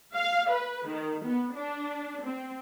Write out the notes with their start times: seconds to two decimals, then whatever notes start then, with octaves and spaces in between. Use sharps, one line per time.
0.15 F5
0.50 B4
0.87 D#3
1.25 B3
1.55 D4
2.25 C4